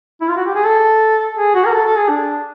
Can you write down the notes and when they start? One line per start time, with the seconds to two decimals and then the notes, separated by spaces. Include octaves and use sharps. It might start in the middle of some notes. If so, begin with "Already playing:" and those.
0.21 E4
0.28 F4
0.37 F#4
0.46 G4
0.55 G#4
0.64 A4
1.37 G#4
1.55 F#4
1.65 A#4
1.72 A4
1.86 A4
1.96 G#4
2.09 D4